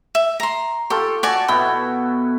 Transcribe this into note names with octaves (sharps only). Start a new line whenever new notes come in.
E5
A#5 C6
F4 G4 A4 C#6
F#4 D5 G#5 A5
B2 B3 E4 G5